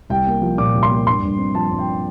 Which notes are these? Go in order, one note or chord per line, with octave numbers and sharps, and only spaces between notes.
C2 G5
A#3
F3
A#2 D6
C2
C6
A#3
G2 C6
G2
C4
F3 A5
G2
G5